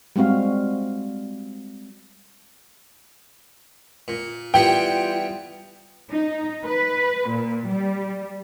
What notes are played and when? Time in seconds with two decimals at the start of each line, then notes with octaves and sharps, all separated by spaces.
0.16 G3 G#3 C4 F#4 F5
4.08 A#2
4.54 E3 G3 B3 F4 G5
6.11 D#4
6.64 B4
7.29 A#2
7.67 G3